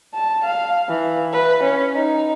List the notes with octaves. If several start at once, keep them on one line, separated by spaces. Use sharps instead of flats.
A5
F5
E3
B4
C#4
D#4